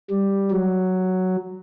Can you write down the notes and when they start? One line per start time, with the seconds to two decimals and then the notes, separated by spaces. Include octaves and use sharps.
0.10 G3
0.51 F#3